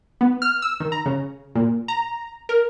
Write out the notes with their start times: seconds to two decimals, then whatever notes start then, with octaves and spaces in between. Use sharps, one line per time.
0.21 B3
0.42 F6
0.62 E6
0.80 D#3
0.92 A#5
1.06 C#3
1.55 A#2
1.88 A#5
2.49 A#4